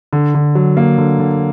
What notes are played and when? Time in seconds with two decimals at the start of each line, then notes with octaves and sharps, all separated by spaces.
0.13 D3
0.34 D3
0.55 F#3
0.77 A#3
0.98 D3
1.19 D3